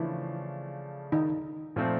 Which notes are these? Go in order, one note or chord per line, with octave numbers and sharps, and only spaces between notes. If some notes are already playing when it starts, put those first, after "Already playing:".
Already playing: C#3 E3 F3 A3 D4 E4
D#3 D#4
A#2 F3 A3 C4